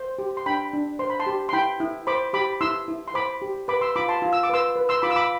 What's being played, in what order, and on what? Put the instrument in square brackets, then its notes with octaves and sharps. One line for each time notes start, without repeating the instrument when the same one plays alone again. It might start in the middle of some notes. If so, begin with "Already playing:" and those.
Already playing: [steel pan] C5
G4
C6
D4 G5 B5
D4
C5 C6
B5
A5 C6
G4
C6
E4 G5 B5
E4
C5 B5 D6
G4 B5 D6
E4 C6 E6
E4
C6
C5 B5 D6
G4
B4 B5 D6
C6 E6
F4 B5 D6
A5 C6
F4
E6
D6
B4 C6 E6
B4
C6 E6
F4 B5 D6
E6
B5 D6